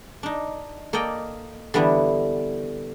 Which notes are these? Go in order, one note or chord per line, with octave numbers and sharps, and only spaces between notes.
D4 D#4
A#3 A4 D5 D#5 G5
D3 E3 G3 B3 D4 E4